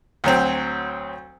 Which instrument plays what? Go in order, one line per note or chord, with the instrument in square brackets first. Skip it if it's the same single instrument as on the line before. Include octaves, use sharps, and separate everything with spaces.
[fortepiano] D2 F#3 C4